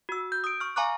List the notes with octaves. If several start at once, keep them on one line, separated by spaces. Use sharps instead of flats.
F#4 E6
G6
D#6 D7
C#6 F6
F5 G#5 A#5 C#6 D6 F#6